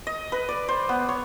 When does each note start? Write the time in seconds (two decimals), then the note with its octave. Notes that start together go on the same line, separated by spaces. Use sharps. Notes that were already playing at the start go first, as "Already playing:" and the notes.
0.07 D#5
0.32 B4
0.49 D5
0.68 C5
0.89 B3
1.09 C#5